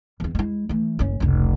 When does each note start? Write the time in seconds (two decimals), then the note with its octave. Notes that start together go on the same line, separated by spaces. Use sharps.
0.20 E2 C4
0.35 G#3 E4
0.69 E3 A3
0.99 F#1 C#4
1.20 F1 C#2